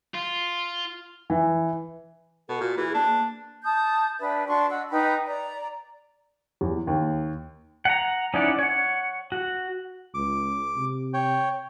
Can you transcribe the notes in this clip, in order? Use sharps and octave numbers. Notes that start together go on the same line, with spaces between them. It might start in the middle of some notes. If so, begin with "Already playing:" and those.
F4
E3
B2 A4
A#2 F#4
E3 G#4
A#3 D4
A5 D#6 G6
D4 G4 B4 E5
D4 F#4 C6 C#6
D#5 F#5 E6
D#4 B4 G5 B5
D5 A#5
E2
D#2
F#5 A#5
C#4 D#4 E4 D5 F#5
C#5 F#5
F#4
C#2 D6
C3
C#5 G5